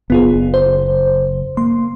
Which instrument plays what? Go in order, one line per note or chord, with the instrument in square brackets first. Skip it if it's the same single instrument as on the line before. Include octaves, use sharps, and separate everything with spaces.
[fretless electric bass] F#1 [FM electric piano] B3 F4 G#4
[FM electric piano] C5
[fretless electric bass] A#3 [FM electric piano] C6